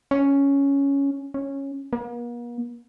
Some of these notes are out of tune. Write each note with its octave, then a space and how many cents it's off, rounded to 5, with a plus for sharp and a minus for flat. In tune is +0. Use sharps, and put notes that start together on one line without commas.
C#4 +5
C#4 -10
A#3 +45